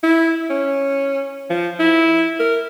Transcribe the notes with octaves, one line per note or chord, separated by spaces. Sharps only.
E4
C#4
F3
E4
A#4